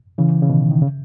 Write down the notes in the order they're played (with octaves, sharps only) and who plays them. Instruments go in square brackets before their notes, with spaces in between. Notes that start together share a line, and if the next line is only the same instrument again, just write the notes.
[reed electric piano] C#3 E3
C#3
B2 D#3
D#3
C#3